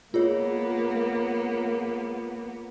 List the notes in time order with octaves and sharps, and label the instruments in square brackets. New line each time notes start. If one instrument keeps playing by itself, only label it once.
[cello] A#3 B3 [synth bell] F4 G#4 C#5